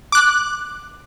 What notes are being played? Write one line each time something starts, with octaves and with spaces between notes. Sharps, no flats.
D6 F#6